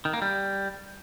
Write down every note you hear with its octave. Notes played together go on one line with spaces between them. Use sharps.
D#3
A#3
G3